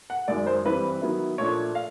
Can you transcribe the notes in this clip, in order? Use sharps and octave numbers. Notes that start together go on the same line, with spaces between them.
F#5
F#2 D#3 G#3 D5
C5
G2 E3 G3 C4 B4
D#3 F#3 B3 E4
A#2 F3 A3 D4 C#5
F5